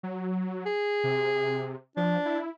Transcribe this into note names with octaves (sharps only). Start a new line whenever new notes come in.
F#3
G#4
C3
F3 D4
E4